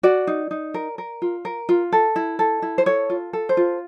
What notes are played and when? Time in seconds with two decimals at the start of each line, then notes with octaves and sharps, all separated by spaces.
0.03 F#4 D5
0.27 D#4
0.51 D#4
0.74 A#4
0.98 A#4
1.22 F4
1.45 A#4
1.69 F4
1.92 A4
2.16 E4
2.39 A4
2.62 E4
2.78 C5
2.86 A4 C#5
3.10 F4
3.33 A4
3.49 C5
3.57 F4